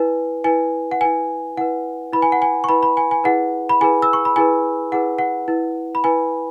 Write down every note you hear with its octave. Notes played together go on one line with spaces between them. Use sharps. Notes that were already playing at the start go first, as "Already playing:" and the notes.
Already playing: E4 B4 G#5
E4 B4 G#5
F#5
E4 B4 G#5
E4 B4 F#5
E4 B4 B5
G#5
F#5
G#5
C#6
E4 B4 B5
B5
G#5
G#5
E4 G#4 B4 F#5
B5
E4 G#4 B4 G#5
E6
C#6
B5
E4 G#4 B4 G#5
E4 G#4 B4 F#5
F#5
E4 B4
B5
E4 B4 G#5